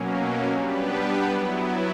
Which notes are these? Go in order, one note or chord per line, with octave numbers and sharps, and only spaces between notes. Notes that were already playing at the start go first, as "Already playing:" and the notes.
Already playing: B2 F#3 A#3 C#4
G3 B3 D4 G4 B4
F#3 B3 E4